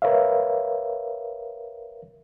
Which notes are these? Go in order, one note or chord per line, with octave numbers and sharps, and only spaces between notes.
A#4 B4 C#5 E5 F5